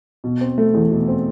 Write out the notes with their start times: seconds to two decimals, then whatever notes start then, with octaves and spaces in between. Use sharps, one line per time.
0.24 B2
0.41 C4
0.58 A3
0.74 E2
0.91 B2
1.08 C4